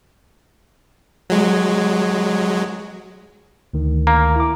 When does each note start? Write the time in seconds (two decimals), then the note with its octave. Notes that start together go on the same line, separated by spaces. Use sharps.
1.30 F#3 G#3
3.74 D2 D#3
4.07 A#3 A#5
4.36 E4 D6